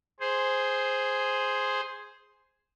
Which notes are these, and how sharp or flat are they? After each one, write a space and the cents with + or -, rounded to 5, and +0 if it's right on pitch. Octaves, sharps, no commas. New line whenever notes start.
G#4 +0 C5 +0